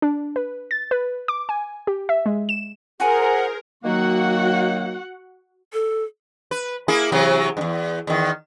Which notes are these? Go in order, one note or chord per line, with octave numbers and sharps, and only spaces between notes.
D4
B4
A6
B4
D6
G#5
G4
E5
G#3
E7
F4 G#4 A#4 C5 F#5 G#5
D#3 F#3 A#3 F#4 F#5
A4
B4
A#3 E4 G#4
C3 E3 F#3
E2 G2
E2 D#3